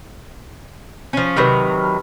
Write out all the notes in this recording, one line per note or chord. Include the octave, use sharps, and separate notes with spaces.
F3 C#4
C3 D#3 F#3 B4 B5 F6